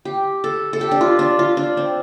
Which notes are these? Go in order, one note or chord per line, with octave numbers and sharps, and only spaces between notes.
G4
A4
A4
G4
D4
F4
D4
F4
D4
C4